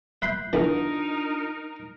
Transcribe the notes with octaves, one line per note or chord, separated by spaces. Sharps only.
E5 B5 C6 F#6 G6
E2 D3 E3 D4 D#4 F4 A#4